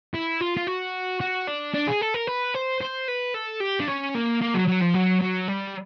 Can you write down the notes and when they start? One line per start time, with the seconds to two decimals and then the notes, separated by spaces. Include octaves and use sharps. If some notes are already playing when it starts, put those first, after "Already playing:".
0.14 E4
0.41 F4
0.57 F4
0.67 F#4
1.21 F#4
1.47 D4
1.74 D4
1.87 G#4
2.01 A4
2.14 A#4
2.27 B4
2.54 C5
2.81 C5
3.08 B4
3.34 A4
3.61 G4
3.80 D4
3.88 C#4
4.15 A#3
4.42 A#3
4.55 F#3
4.68 F#3
4.81 F3
4.94 F#3
5.21 F#3
5.48 G3